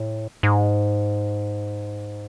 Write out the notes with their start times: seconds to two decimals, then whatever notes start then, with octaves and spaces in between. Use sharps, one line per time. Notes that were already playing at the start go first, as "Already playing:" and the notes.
Already playing: A2
0.43 G#2